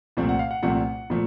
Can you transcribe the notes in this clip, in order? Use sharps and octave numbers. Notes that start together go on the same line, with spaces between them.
C2 A#2 F3 A3 C4
F#5
F5
F#5
C2 A#2 F3 A3 C4 F#5
A#2 F3 A3